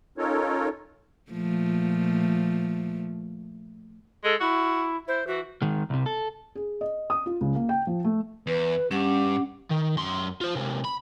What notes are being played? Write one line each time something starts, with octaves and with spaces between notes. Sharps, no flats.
C#4 D#4 F4 A4 A#4 C#5
A#2 F3 A3
G#3 A4
E4 F#4
E4 C5
E3 F#4
D#3 G#3
C2 C3
A4
G#4
D#5
D#6
F4
C#2
A#3
G5
F3
A3
E2 B4
G2 C#4 G4 F#5
D#3
F#2 C6
F4 C5
C3 G#3
B5